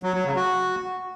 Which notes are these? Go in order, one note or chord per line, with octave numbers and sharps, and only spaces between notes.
F#3
F#3
C#3
F#4